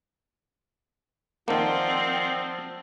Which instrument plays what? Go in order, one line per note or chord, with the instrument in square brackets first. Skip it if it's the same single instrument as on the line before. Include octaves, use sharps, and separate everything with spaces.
[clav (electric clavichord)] D#3 A#3 [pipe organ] F3 [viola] C4 [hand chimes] D5 F#5 A5